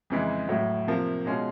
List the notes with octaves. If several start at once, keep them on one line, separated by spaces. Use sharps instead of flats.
F2 C#3 E3 G#3
A2 F#3 A3
C3 F3 A#3
B2 G#3 C#4 F4